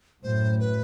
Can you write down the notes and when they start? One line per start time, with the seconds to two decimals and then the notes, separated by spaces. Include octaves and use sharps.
0.23 F#2 A2 C5
0.59 B4